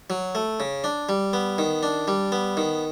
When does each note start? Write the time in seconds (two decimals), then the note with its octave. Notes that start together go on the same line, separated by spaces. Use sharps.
0.10 F#3
0.35 A3
0.60 C#3
0.84 D4
1.09 G3
1.33 B3
1.58 D#3
1.83 D4
2.08 G3
2.32 B3
2.57 D#3